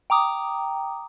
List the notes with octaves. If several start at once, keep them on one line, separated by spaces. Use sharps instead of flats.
G5 A#5 D6 D#6